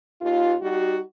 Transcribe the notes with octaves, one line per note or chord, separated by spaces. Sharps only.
D#2 F4
G3 D#4 F#4